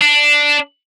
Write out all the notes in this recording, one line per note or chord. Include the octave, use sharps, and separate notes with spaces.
D4